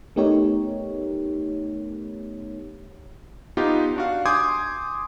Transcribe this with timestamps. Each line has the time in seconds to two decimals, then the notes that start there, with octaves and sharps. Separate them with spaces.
0.16 A3 B3 D#4 G4 A#4 C#5
3.57 B3 D#4 F4 G4
3.96 D4 F#4 F5
4.26 G#5 C6 D6 D#6 G6 G#6